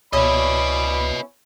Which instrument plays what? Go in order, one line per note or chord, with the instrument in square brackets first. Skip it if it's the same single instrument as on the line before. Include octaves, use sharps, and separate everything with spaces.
[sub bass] C#2 [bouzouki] B2 C#4 E4 [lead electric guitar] B4 D#5 [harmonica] D5 B5